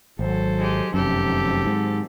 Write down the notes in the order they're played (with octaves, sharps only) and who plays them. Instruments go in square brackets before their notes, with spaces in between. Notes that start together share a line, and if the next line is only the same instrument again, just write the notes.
[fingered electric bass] G#1 [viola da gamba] F#3 A4 C5
[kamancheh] G#3 G4
[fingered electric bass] F1 F#2 [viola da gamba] D#3 F#3 C4 [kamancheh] G4 A4
[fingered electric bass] G#2